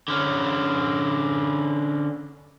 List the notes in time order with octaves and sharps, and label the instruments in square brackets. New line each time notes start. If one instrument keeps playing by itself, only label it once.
[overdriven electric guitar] D3 C#4